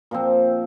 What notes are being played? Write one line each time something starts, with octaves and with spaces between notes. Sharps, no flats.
A#2 F3 C4